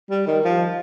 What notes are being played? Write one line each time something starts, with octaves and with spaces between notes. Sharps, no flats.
G3
D#3
F3